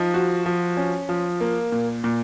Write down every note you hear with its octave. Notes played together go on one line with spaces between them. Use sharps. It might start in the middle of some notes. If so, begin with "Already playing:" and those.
Already playing: F3 D#4
F#4
F3
C#4
F3
A#3
A#2
A#2